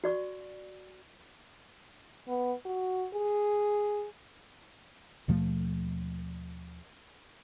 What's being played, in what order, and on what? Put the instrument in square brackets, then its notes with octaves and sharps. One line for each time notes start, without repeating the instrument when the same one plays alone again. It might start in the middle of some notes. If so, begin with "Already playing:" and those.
[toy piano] F#4 D5 C#6
[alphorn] B3
F#4
G#4
[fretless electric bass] D#2 B2 F3 A3